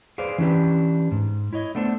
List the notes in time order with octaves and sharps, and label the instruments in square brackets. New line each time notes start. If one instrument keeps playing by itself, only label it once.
[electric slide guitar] G#4 B4 C5 D5 F5
E3 C#4 D4 G4 B4
G#2
E4 C#5 D#5
A3 B3 D4 A4 C5